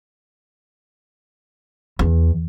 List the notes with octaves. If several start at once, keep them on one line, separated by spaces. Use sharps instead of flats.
E2